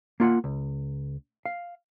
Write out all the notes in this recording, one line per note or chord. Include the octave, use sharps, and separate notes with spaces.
A#3 F4 F#5
C#2
F5